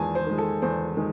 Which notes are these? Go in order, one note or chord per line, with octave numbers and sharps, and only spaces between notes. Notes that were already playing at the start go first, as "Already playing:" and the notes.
Already playing: E2 D#3 G#3 G#5 A5
C5
D#3 G#3
A4
E2 C5
D#3 G#3